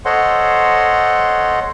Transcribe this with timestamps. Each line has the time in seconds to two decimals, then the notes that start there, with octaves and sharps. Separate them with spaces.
0.05 A4 C5 C#5 D#5 F#5 C6